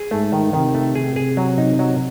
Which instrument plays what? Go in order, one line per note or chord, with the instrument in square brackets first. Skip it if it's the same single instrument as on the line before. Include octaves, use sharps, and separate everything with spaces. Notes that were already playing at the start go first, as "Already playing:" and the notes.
Already playing: [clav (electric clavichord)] G#4
[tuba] G#2 [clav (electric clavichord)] A3
[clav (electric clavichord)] D#3
[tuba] C3 [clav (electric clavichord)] D#3
[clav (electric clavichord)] A3
G#4
G#4
F#3
D#4
F#3